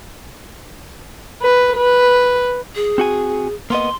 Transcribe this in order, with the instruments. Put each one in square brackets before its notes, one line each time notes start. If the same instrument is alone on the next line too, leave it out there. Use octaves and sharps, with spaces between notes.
[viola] B4
B4
[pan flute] G#4
[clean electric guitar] C4 F#4 G#5
[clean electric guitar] A#3 B3 D#5 [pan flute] C6